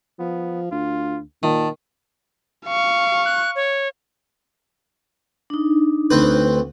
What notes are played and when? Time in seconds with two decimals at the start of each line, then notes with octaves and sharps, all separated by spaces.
0.19 F3 B3
0.72 D2 F4
1.43 A#2 D#3 A5
2.66 F5 C#6
3.25 F#6
3.55 C#5
5.50 D4 D#4
6.10 D2 C4 B4